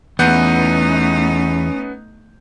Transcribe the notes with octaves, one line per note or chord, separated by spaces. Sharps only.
E2 A3 B3 C#4 D#4 F#5 G6